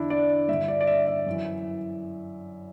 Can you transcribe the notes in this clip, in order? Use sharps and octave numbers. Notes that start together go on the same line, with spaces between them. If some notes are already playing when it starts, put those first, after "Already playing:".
Already playing: E2 D3 D4 E4
D5
G2 D3 E5
D5
D5
E5
E5
F#2 E3